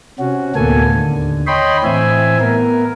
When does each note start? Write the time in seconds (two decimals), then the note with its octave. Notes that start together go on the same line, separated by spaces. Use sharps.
0.19 C3 C#4 F#4
0.55 D2 A2 A#3 B3 A4 G#5
0.95 D#2 D3
1.47 C#5 D#5 G5 B5 C6
1.84 A2 E3 C4 E5 G#5
2.40 B3 A#4